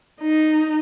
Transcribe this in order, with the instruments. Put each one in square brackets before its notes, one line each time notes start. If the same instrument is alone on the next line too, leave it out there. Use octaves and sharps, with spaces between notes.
[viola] D#4